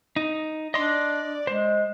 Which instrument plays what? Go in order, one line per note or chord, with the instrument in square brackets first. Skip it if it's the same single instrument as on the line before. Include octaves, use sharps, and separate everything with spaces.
[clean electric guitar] D#4
[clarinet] D4 [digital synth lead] D5 [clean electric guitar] D#5 C6
[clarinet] G#3 [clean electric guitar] C5